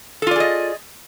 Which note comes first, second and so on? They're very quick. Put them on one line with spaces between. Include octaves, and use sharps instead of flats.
A4 F4 D5 G#4 D#5